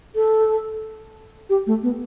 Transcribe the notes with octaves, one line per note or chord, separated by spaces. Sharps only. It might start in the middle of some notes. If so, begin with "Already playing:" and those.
A4
G4
A3
B3